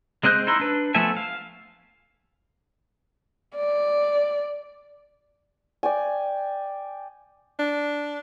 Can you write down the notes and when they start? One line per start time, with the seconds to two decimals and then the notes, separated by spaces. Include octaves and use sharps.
0.23 G#3 C4 D#5 F#6 G6
0.47 D#4 E4 C6
0.60 D4 B4
0.94 F3 A3 B3 E5 G#5
1.17 F5
3.56 D5
5.83 D5 G5 G#5
7.59 D4